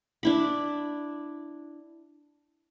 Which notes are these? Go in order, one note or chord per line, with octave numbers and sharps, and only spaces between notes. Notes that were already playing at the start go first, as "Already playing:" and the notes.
D4 E4 B5